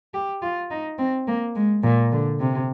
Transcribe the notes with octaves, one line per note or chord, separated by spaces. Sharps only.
G4
F4
D#4
C4
A#3
G#3
A#2
D3
C3